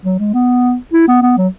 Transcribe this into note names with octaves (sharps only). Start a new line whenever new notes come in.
F#3
G#3
B3
E4
B3
B3
F#3